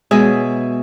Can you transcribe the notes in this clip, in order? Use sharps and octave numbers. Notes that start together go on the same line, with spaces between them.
B2 G#3 G#4 E5